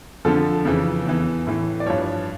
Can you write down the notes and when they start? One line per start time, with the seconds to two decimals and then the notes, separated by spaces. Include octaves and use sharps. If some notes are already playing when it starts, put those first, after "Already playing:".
0.25 F2 D3 F3 A4
0.65 F2 C#3 E3
1.06 E2 E3
1.47 A2 E3
1.80 D5
1.87 G2 F3 C#5